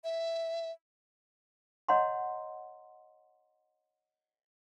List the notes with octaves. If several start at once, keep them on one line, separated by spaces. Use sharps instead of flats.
E5
C#5 D#5 F#5 A#5 C6